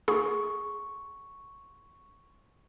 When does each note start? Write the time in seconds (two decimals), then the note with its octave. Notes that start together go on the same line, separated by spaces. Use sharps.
0.08 G#4 C#6